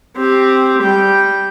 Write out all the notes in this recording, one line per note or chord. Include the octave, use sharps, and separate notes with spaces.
C4 G4
G3 G5